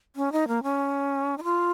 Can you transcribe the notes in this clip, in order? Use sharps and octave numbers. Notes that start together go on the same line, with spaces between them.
C#4
D#4
A#3
C#4
D#4
F4